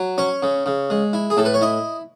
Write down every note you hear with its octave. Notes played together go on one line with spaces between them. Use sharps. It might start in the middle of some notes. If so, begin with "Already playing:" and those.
Already playing: F#3
C#4 C#5
C#3
C#3
G#3
E4
G#4
A2 A4
B4
C#5
E4 D#5